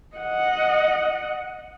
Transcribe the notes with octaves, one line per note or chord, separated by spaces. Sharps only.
D#5 F#5